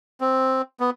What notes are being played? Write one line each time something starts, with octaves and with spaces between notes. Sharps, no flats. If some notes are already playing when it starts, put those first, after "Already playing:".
C4
B3